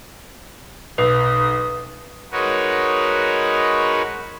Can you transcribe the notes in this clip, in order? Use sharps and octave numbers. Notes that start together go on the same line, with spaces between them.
B1 B4 D#6
G#3 D#4 F#4 A#4 B4 C#5